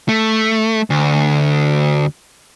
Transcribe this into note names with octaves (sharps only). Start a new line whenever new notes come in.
A3
D2